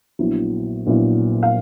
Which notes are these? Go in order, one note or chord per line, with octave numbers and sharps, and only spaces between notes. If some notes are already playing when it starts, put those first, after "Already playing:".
A#1 A#2 F#3 B3 E4
A#1 A#2 F#3 B3 E4
F5